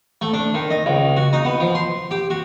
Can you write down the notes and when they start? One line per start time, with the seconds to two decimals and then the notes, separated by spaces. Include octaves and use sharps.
0.21 A3
0.33 D4
0.54 D#3
0.70 D#5
0.86 C#2
1.17 F#4
1.33 D#4
1.45 B3
1.60 F3
1.75 C6
2.11 G4
2.30 F#4